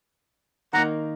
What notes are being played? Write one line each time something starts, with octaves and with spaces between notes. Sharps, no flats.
D#3 A#3 D#4 F#5 A#5